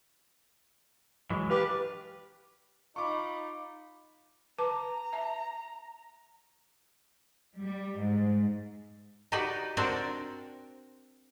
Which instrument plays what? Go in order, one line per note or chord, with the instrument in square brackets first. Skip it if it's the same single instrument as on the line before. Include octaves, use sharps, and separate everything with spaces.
[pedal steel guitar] E3 F#3 G#3
[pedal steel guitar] D4 F5 [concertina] G4 B4
[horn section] D#4 F4 B5 [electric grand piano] C#6 D6
[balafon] B4 A5 D6 [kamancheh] A#5
[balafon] E5 A5
[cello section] G3
G#2
[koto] D#4 F#4 G4 B4 D5 G5
C4 D4 F#4 A#4 C5 D5